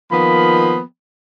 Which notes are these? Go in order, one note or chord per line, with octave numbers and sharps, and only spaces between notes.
D#3 F3 A#3 B3 B5